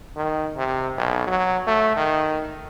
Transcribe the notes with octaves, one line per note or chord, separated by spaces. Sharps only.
D#3
C3
B1
F#3
A3
D#3